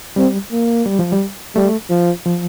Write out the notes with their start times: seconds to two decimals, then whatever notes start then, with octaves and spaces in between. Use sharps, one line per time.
0.16 G3 C4
0.52 A#3
0.86 G3
0.99 F3
1.12 G3
1.56 G3 A3
1.90 F3
2.26 F3